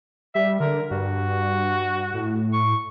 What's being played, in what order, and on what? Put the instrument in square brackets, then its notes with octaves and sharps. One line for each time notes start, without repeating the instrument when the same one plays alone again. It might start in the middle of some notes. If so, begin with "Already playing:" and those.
[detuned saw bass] G3 [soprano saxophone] E5
[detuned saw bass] D3 [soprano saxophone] A#4
[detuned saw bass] G2 [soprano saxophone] F#4
[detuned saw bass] A2
[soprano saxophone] C#6